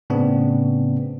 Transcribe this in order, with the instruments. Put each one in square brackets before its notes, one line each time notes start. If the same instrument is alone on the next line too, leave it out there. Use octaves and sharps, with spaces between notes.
[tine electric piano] A2 C#3 B3 C4 D4